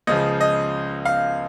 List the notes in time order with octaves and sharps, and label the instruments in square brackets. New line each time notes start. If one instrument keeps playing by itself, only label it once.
[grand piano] C#2 C#3 F3 D#5
D#5
F5